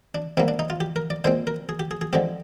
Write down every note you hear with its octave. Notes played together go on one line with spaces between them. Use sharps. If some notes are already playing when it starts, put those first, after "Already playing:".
D4
G#2 G3 A#3 C4
D4
D#4
F4
G4
A#4
D5
A#2 G#3 C4 C5
A#4
G#4
G4
G#4
G#4
D3 F3 G#3 C4 G4